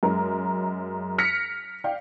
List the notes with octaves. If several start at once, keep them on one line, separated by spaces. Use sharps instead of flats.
F#2 G#3 A#4
F6 A#6 B6 C#7
D5 F5 G5